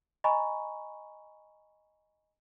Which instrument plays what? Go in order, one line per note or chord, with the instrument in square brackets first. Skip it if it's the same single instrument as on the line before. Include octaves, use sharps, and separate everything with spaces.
[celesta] D#5 G#5 A#5 B5 C#6